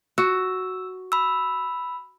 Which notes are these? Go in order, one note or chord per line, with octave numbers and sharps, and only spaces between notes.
F#4 E6
B5 E6